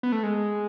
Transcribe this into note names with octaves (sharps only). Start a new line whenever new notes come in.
B3
A3
G#3